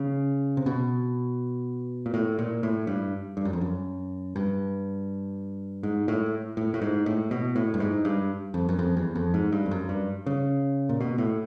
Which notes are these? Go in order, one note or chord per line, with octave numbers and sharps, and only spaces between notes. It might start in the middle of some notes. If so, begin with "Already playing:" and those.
Already playing: C#3
C3
B2
A#2
A2
A#2
A2
G2
G2
F#2
F2
F#2
G2
G#2
A2
A2
A2
G#2
A2
B2
A2
G2
G#2
G2
F2
F#2
F2
E2
F2
G#2
G2
F2
F#2
G2
C#3
A#2
B2
A2